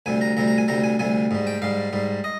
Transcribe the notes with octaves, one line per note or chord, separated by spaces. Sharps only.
D2 C3 G3 G#5
A#5
D2 C3 G3 A#5
A#5
G#5
D2 C3 G3 A#5
G#5
D2 C3 G3 G#5
G#2 G3
G5
G#2 G3 F5
G#2 G3
D#5